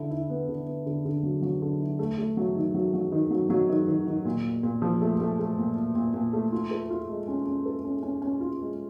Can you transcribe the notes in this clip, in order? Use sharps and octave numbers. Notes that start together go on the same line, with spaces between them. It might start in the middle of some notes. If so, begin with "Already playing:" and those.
Already playing: D3 E4
E4
B3
D3
B3
D3
D3
F#3
F#3
D3
E4
A3
A3
F#3
D#3
F#3
F#3
D#3
F#3
F#3
D#3
D#3
D#3
A#2
A#2
A#2
F3
A3
A3
A3
A#2
A#2
A#2
A#2
A3
F4
A4
F4
G#3
C#4
C#4
A4
C#4
C#4
C#4
F4
G#3